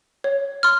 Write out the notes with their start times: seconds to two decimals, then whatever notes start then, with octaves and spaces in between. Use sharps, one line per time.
0.24 C#5
0.63 C6 F6